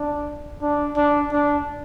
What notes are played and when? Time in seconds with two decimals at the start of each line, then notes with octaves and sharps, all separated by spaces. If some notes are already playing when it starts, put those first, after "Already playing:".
Already playing: D4
0.62 D4
0.97 D4
1.32 D4